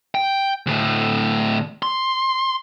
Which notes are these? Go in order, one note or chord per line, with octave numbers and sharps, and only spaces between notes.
G5
D2 A2
C6